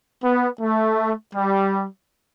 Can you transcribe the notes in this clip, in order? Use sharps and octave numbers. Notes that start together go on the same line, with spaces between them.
B3
A3
G3